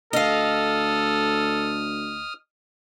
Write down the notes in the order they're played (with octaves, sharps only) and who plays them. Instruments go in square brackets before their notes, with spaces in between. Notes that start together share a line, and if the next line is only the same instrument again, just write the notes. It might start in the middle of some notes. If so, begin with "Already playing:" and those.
[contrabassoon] D2 [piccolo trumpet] A4 [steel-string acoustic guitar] D#5 F5 [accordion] D#6 F6